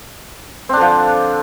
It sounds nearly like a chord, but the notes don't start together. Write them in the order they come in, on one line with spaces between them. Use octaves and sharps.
C4 D4 D3 F3